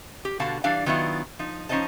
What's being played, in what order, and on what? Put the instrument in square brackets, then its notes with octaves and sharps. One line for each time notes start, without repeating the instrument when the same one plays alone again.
[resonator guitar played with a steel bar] G4
B2 D3 F#4 F5 A5
E3 G3 D4 D5 F5
D#3 F#3 B3 D4 E4 F4
F3 D#4
F3 C#4 D#4 C5 D#5 A5